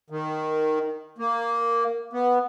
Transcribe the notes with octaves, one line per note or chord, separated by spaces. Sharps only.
D#3
A#3
B3